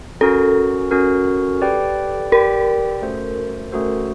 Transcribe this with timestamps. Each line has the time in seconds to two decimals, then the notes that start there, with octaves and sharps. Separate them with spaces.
0.21 C#4 F#4 A4 A#4
0.91 C#4 F#4 A#4
1.61 G4 B4 D5 G5
2.32 G4 A#4 B4 D5 G5
3.02 A3 C#4 F#4 A4 C5
3.72 A3 C#4 F#4 A4 C5